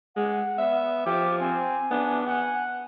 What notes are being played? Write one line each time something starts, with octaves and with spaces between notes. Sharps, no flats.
G#3 F#5
B3 E5
F3 G4 D6
C4 G#5
B3 D4
F#5 G#5